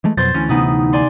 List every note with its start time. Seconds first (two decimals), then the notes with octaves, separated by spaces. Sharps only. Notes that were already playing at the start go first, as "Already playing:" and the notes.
0.04 E3 G#3 A3
0.17 F2 B2 F#3 C5 C6 A6
0.34 D2 E3 C#4
0.49 C3 B3 D#4
0.93 D5 G#5 C6